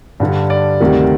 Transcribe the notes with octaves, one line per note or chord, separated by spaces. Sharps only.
G2 D3 G3
D5
D2 C3 D#3 G3